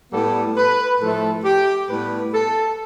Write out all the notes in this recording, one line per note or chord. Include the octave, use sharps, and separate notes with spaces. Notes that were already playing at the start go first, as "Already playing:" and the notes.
A2 G3 B3 A4
B4
A2 F3 A3 A4
G4
A2 G3 B3 B4
A4